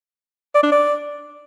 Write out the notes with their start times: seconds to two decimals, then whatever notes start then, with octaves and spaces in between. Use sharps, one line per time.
0.54 D5
0.63 D4
0.72 D5